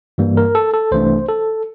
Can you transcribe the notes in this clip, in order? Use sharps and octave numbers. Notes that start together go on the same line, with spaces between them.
G2 E3 G3 A#3
A#4
A4
A4
C2 C3 E3 A3 D4 C5
A4